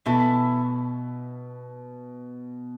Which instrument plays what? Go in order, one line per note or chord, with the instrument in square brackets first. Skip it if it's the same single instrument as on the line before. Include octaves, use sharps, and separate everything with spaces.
[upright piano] B2 [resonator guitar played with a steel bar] E3 A3 E4 A4